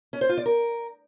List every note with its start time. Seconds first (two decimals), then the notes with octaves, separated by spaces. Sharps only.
0.13 C#4
0.21 C5
0.29 F4
0.37 D5
0.46 A#4